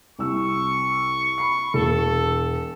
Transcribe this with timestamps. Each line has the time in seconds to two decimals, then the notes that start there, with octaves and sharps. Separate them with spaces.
0.19 C2 C#6 E6
1.38 B5 C7
1.74 E1 A4